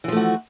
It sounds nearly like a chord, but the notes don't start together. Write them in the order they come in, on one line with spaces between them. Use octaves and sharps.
E3 F3 A3 F#4